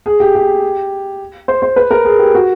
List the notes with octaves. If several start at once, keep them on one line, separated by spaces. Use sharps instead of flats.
G#4
G4
G4
C5
C5
B4
A#4
G#4
G4
F#4